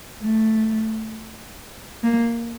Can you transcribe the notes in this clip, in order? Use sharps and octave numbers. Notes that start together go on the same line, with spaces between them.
A3
A#3